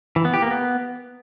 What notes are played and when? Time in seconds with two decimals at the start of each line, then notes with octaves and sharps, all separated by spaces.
0.16 E3
0.25 B3
0.34 G4
0.42 A#3
0.51 B3